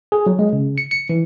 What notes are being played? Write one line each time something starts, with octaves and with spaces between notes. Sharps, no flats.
G#4
F#3
G#3
C#3
C#7
C#7
E3